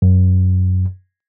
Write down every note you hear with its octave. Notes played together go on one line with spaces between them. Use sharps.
F#2